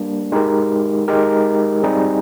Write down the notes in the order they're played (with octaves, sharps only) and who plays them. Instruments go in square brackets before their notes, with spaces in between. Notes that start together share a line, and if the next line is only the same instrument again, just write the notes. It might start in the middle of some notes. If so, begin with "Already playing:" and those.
Already playing: [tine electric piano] G3 A#3 D4
G#3 D#4 G4 A#4
G#3 D#4 G4 A#4
G3 C4 D#4 G#4